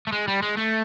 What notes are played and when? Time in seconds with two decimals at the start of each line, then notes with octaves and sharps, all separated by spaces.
0.07 A3
0.12 G#3
0.28 G3
0.42 G#3
0.57 A3